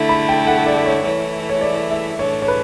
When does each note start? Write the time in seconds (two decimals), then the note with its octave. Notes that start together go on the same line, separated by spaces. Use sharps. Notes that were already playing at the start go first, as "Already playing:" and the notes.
Already playing: D3 A3 E4
0.09 B5
0.29 G5
0.47 F#5
0.66 D5
0.86 C#5
1.04 E3 A3 E4 C#5
1.50 C#5
1.61 D5
1.91 E5
2.19 A2 E3 A3 D4 C#5
2.42 C#5
2.48 B4